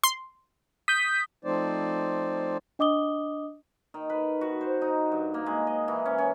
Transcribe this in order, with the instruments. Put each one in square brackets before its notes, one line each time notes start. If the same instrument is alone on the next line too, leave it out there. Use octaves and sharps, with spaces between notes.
[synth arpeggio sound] C6
[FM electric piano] D#6 G6 [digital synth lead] B6
[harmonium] F3 A3 C4 D#4 C5 D5
[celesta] D4 D#5 D6 D#6 G7
[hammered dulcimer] D#3
B4
F#4
C5
D#4
G2
A#3
G#3
D#5
E3
C#4
C#4